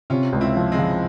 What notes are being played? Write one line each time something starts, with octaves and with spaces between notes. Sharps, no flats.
C3 C#4 F4
C#2
C4 E4
F3
G#3 C4
F3